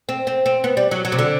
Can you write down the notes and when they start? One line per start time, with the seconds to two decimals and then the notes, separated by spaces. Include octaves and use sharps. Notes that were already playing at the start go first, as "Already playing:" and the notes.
0.09 C4
0.27 C4
0.46 C4
0.64 B3
0.77 G3
0.91 F#3
1.05 F#3
1.12 C3
1.19 D3